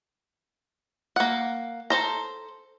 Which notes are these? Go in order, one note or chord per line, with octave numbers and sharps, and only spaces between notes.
A#3 F#5
A4 C5 A#5